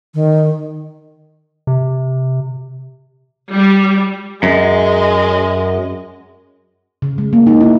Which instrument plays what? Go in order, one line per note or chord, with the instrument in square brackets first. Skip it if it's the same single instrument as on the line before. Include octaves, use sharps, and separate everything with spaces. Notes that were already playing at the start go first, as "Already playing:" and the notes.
[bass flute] D#3
[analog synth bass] C3
[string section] G3
[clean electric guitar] F#2 [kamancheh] G#3 D#5
[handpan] C#3
G#3
A#3
D#4
E4